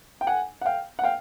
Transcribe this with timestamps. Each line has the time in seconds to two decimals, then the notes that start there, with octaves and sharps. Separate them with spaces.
0.21 G5
0.27 F#5 G#5
0.61 F#5
0.66 F5 G5
0.99 F#5
1.04 F5 G5